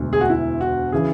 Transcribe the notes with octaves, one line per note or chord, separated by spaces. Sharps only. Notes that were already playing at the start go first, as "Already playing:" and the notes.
Already playing: E1 D2 D3
G#4
F#4
E4
F#4
C#3 E3 G#4